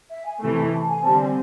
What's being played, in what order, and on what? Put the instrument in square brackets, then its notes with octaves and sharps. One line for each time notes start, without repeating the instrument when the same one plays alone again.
[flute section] E5
G#5
[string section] C3 E3 A3
[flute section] G#5
A5
G#5
[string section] D3 G3 C4 [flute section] A5
[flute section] G#5